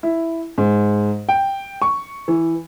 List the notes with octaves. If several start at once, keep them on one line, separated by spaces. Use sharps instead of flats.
E4
G#2
G5
C#6
E3